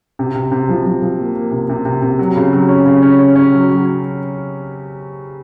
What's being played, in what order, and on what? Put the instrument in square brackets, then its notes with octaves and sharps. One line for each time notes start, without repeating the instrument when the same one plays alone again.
[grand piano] C3
C3
C3
F3
F3
F3
A#3
A#3
C3
C3
C3
C3
F#3
C#3
F#3
C#4
C#3
C#4
C#4
C#4
F#3
F#3
C#4